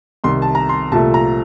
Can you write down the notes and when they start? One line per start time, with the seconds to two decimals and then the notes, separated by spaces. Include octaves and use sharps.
0.24 C2 C3 D#3 C6
0.42 A5
0.55 A#5
0.69 C6
0.92 C2 A#2 F3 A3 A5
1.14 A#5